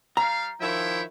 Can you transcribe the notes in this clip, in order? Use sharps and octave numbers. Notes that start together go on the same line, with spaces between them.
G3 F5 A#5
D#3 F3 E4 C#5 E5 G5